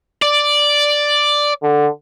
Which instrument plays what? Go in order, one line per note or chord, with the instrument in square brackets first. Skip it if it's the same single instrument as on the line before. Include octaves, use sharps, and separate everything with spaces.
[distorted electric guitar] D5
[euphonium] D3